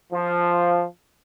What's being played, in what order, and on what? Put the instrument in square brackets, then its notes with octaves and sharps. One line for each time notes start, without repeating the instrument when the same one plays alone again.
[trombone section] F3